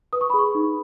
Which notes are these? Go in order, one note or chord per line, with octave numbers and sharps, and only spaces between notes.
B4 D#6
C#6
B5
G#4
C#6
D#4